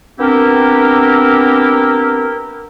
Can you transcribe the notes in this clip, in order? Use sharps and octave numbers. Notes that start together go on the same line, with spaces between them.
B3 C4 D4 E4 G4 A#4